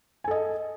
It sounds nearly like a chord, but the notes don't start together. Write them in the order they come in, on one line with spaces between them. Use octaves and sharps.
G#5 A4 D#5